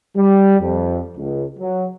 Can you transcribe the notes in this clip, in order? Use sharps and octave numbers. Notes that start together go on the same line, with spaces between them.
G3
F2
C#2
F#3